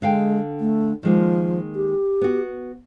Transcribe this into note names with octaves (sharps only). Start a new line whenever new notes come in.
D3 G#3 F5 G5
A3
D#3 F3 G#3 A#3
G4
B3 F#4